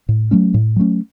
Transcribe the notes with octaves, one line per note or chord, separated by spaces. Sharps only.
A2
F#3 A3 C#4
A2
F#3 A3 C#4